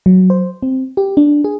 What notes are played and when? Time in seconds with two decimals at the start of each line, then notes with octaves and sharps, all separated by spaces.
0.06 F#3
0.30 C5
0.63 C4
0.97 G4
1.17 D4
1.44 G#4